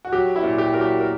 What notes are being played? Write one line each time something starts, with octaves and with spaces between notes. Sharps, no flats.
F#4
F#3 G4
E4
A#2
G4
F#3 A#4
G4
A#4